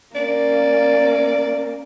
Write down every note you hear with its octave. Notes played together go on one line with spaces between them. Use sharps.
A#3 C#4 D5